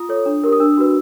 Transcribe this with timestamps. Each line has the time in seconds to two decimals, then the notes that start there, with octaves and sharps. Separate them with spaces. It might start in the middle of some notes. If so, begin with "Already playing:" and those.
Already playing: F4 D#6
0.09 A4 C#5
0.26 D4
0.44 G4 A#4
0.52 D#6
0.60 D4 E6
0.77 F#4 B4